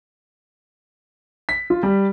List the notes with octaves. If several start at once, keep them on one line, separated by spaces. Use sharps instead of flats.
B6
F4
G3